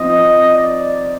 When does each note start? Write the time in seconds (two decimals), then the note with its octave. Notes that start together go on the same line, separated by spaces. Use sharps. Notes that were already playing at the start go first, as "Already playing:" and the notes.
Already playing: F3 C4 D#4 D#5
0.55 D5